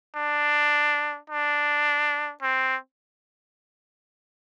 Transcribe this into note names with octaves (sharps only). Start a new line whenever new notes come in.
D4
D4
C4